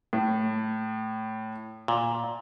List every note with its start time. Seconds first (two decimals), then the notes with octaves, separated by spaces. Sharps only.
0.13 A2
1.88 A#2